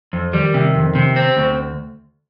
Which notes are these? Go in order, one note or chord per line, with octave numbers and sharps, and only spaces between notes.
F2
F3
D#3 G3
C3
F2
C3
C4
D2